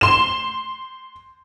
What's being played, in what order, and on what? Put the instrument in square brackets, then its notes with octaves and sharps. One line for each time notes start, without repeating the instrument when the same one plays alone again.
[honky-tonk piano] C6 E7